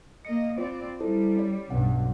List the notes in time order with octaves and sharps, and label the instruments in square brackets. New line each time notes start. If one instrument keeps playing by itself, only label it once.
[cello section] A#3 D#5 [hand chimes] C#7
[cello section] C4 D5 [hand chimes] F4 C5
[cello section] G3 [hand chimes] E4 A4 C5
[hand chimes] C#4 C#5 D5
[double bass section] B1 G2 [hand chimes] C#4 F#5